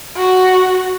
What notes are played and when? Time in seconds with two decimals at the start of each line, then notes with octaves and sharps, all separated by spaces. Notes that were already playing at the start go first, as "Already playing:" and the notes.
0.17 F#4